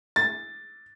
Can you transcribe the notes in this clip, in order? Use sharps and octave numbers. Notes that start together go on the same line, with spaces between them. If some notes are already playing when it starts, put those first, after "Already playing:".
A6